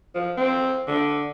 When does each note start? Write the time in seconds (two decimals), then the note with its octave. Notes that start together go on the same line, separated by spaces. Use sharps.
0.15 F3
0.37 C4
0.88 D3